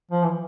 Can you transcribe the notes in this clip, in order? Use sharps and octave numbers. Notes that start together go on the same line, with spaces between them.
F3
E3